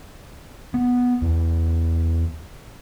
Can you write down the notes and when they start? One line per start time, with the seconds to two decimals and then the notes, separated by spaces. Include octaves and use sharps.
0.74 B3
1.22 E2